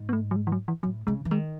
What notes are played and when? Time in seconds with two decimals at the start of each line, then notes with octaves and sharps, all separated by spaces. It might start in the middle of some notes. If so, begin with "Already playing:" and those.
Already playing: G#2
0.09 B3
0.13 A3
0.31 F#3
0.36 G#3
0.47 E3
0.52 F#3
0.68 E3
0.83 A2 F#3
1.07 C#3 G#3
1.25 E3
1.31 D#3 G#3